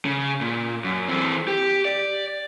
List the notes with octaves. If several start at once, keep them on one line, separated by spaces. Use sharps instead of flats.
C#3
A#2
F#2
E3 C4
G4
D5